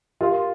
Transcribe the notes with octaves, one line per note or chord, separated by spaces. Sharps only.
F4 G4 A#4 F5 C6